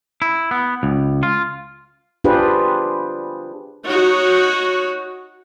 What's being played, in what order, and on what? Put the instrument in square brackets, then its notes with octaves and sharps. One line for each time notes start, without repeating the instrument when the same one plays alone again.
[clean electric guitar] E4
B3
C#2
F4
[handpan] D4 F4 G4 G#4 B4 C5
[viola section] D#4 F#4 C#5